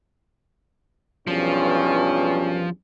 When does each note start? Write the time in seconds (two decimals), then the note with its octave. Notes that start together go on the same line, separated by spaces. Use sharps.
1.27 B1 E2 G2 F3 C#4